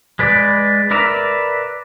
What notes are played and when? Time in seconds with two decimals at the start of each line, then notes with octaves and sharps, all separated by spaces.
0.19 G#3 B4 D5
0.91 A#4 B4 D5 E5 A#5